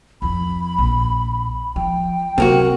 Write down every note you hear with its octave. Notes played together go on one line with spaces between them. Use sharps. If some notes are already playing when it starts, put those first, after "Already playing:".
F2 F3 B5
A#1
F3 G5
C3 F#3 A#3 F#4